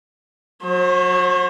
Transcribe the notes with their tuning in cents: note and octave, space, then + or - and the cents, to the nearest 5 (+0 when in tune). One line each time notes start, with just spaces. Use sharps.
F#3 -25 C5 +40